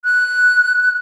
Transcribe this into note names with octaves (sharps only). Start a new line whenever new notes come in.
F#6